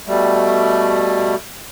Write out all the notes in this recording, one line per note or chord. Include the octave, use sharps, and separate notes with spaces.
B2 G3 A3